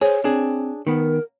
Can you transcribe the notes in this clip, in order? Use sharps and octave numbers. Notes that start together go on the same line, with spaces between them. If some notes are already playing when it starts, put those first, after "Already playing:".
G#4 C5 C#5
C4 D4 G#4
D#3 B3 A#4